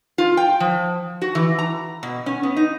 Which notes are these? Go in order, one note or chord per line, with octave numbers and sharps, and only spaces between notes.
F4
G5
F3
F#4
E3
A#5
B2
C#4
B3
D#4